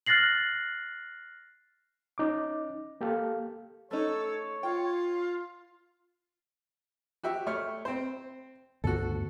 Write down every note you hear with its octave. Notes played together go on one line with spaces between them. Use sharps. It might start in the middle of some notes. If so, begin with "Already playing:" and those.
F6 F#6 A6 A#6 C7 F#7
C#4 D#4 D6
A#3 G4 A4 F5
A3 C#4 D#4 A4 C#5
F4 G5
F#4 G4 E5
A3 C#5 F6
C4 C5
D2 G2 B3 F#4 A4